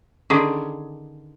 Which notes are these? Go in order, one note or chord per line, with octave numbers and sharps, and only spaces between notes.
D3 D#3 C#4 G#4